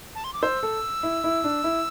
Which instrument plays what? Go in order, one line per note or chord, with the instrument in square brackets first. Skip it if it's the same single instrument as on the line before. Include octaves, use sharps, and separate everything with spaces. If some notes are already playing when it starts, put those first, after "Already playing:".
[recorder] A5
C6
D6
[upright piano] C5 [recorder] E6
[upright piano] A4
E4
E4
D4
E4